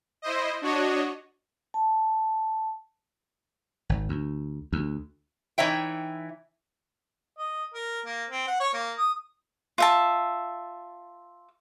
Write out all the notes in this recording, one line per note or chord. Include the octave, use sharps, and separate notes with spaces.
E4 C5 D#5
D4 F#4 C#5 D#5
A5
G#1
D2
D2
E3 D#4 C#5 E5 G5
D#5
A#4
A#3
C4
F#5
C#5
A#3
D#6
F4 E5 A5